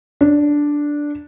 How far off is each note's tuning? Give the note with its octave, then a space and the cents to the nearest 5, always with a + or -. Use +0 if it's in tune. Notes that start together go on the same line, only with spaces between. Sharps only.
D4 -5